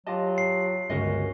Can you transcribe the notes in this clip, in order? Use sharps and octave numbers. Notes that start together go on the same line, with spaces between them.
F#3 F4 G4 D#5 A5
C7
G1 C#2 C#4 F#4 A#4 D#5